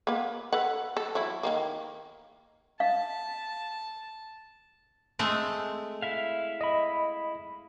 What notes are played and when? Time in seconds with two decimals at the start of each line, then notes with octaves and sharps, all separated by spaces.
0.07 A#3 B3
0.52 A4 B4 F#5
0.97 A4
1.15 E3 F#3 E4
1.43 D#3 F#3 A#3
2.80 F5 A5
5.19 G#3 A3 C4
6.02 E4 E5 F5
6.61 D#5 B5